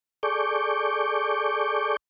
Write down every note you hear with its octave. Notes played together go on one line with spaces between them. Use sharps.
G#4 A4 D5 C#6 D6 G6